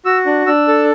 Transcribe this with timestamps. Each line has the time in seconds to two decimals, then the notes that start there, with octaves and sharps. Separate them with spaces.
0.05 F#4 E6
0.26 D4
0.47 D4 E6
0.68 A4